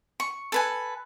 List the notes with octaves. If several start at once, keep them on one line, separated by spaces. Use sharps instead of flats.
C#6
A4 B4 G#5